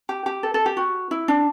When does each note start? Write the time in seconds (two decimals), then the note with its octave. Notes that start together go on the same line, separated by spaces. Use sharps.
0.09 G4
0.26 G4
0.43 A4
0.54 A4
0.66 G4
0.77 F#4
1.11 E4
1.28 D4